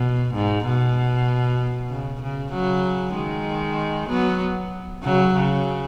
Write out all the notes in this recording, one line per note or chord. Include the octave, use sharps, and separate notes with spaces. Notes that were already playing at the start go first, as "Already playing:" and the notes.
Already playing: B2
G#2
B2
C#3
C#3
C#3 F#3
D#3 G#3
F#3 B3
C#3 F#3
C#3